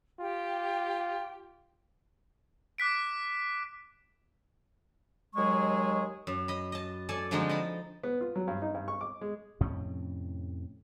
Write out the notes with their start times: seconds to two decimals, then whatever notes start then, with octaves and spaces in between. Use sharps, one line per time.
0.20 F4 G4 G5
2.78 D6 F#6 B6 D7
5.35 D#2 F#3 G#3 G#4 C#6
6.27 F#2
6.48 D#5 B5
6.72 D#5 A5
7.09 A4 D5 G#5 A5
7.31 D3 F3 G#3 C4 D#4
7.49 D#5 A5 B5
8.03 B3
8.21 F4
8.36 F#3
8.48 G2
8.62 D#4
8.74 G2
8.88 C#6
9.01 D6
9.21 G#3
9.61 F2 A2 C3 C#4